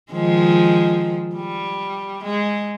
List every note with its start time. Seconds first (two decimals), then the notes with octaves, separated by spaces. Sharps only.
0.12 D#3 F3 G#3
1.36 G3
2.24 G#3